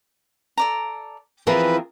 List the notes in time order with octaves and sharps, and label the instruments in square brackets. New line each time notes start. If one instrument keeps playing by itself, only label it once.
[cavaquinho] A4 D5 A#5
[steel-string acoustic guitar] E3 F3 C4 [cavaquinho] F4 G#4 A#4 [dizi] B4